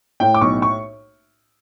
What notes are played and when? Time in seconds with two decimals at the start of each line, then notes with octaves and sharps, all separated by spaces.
0.20 A2 G5
0.34 D6
0.41 B1 C#6
0.62 C#6